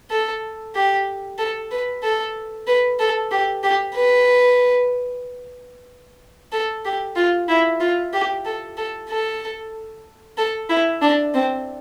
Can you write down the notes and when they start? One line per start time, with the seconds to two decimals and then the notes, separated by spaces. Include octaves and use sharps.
0.11 A4
0.75 G4
1.39 A4
1.71 B4
2.03 A4
2.67 B4
3.00 A4
3.31 G4
3.63 G4
3.96 B4
6.53 A4
6.85 G4
7.16 F4
7.49 E4
7.81 F4
8.13 G4
8.45 A4
8.77 A4
9.09 A4
10.38 A4
10.70 E4
11.02 D4
11.34 C4